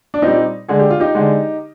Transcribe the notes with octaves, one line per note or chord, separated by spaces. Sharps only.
D4
A#2 G3 C4 D#4
D3 G#3 G#4
G4
F4
D#4 G4
D3 G#3